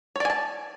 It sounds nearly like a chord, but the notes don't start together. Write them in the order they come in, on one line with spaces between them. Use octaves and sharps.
C#5 D5 G#5 A5